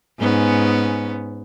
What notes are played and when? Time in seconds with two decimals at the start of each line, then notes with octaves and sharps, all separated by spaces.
0.20 G#2 B3 C#4